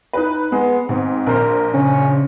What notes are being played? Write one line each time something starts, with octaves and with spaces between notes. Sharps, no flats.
D#4 B4
G#3 B3
G#2 C4
A#1 A#4 C5
C#3 C#4